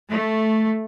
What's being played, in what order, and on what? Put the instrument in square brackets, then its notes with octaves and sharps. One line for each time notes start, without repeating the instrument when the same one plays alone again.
[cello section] A3